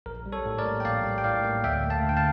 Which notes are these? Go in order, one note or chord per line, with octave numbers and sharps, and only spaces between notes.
A#1 A#4
G3
A4 C#5
A2
A#4 D5
A#3
G5
A#1 D5 F5
G3
G5
A2 D5 F5
A#3
D2 E5 G5
A3
F5 A5
D3
G5
F5 A5